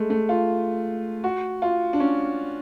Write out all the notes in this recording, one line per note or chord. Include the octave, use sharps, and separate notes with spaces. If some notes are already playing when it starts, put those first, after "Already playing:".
Already playing: G#3 A3
A3
F4
F#4
F4
D4
C#4